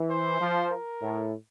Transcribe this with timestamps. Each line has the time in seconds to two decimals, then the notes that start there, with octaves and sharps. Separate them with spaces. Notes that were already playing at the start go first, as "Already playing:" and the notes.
Already playing: E3
0.11 C5
0.41 F3
0.72 A#4
1.02 A2